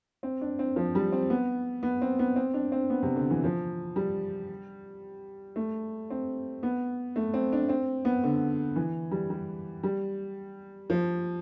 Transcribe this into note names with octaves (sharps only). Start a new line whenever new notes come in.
C4
D4
C4
F3
G3
C4
B3
B3
C4
B3
C4
D4
C4
B3
C3
D3
E3
F3
G3
A3
C4
B3
A3
C4
D4
C4
B3
D3
E3
G3
G3
G3
F3